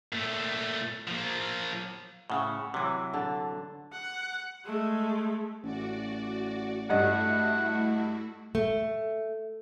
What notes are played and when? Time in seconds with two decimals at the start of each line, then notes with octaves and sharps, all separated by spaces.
0.13 A#2 A3
1.08 F3 A#3
2.30 A2 C#3 F#5 E6
2.74 C3 E3 F#3
3.13 D3 A5
3.92 F#5
4.65 G#3 A3
5.63 A1 F#4 D5
6.90 G2 A3 E4 F#4 D#5 F#5
8.55 A3